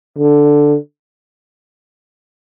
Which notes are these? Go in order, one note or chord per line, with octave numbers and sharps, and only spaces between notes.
D3